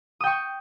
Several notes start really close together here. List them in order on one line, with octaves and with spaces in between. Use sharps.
D#6 G5 C#6